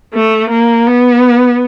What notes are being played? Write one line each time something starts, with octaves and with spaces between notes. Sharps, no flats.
A3
A#3
B3